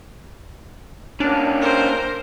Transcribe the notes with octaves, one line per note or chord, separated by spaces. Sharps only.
A#3 C#4 D4
A#4 C5